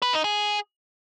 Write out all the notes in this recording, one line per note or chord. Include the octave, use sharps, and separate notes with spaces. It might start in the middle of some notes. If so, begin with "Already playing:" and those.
B4
D#4
G#4